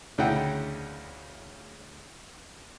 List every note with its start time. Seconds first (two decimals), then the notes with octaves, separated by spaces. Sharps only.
0.18 D2 C#3 D#4 E4 F#5 G5